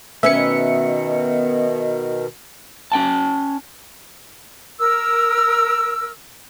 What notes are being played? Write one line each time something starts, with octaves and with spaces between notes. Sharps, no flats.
B2 D#3 B3 C#4 B4 E5 C#7
C#4 G5 A5
A#4 E6